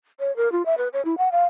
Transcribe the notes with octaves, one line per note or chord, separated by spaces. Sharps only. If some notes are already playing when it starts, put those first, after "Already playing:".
C#5
A#4
F4
E5
B4
C#5
E4
F#5
F5